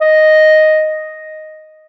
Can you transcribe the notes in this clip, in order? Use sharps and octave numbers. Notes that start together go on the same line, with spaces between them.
D#5